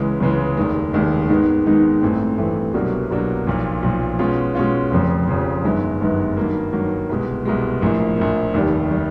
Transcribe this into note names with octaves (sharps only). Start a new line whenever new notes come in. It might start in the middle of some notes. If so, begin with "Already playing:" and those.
Already playing: C#2 C#3 E3 G#3
C#2 C#3 E3 G#3
F1 D#2 D#3 G#3
F1 D#2 D#3 G#3
G#2 D#3 G#3 B3 D#4
G#2 D#3 G#3 B3 D#4
A1 G2 E3 A3 C4
A1 G2 E3 A3 C4
C2 B2 F#3 A#3 D4
C2 B2 F#3 A#3 D4
B1 A#2 F3
B1 A#2 F3
B2 G#3 C#4 F4
B2 G#3 C#4 F4
F1 F2 C#3 F3
F1 F2 C#3 F3
G1 F#2 D#3 G#3 B3
G1 F#2 D#3 G#3 B3
G2 D#3 F#3 A#3
G2 D#3 F#3 A#3
C2 B2 G#3
C2 B2 G#3
A#1 A2 F3 A#3
A#1 A2 F3 A#3
F1 D#2 D#3 G3
D#3 G3